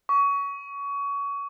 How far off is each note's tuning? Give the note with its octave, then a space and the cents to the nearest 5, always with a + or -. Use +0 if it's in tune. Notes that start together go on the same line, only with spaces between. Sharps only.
C#6 +25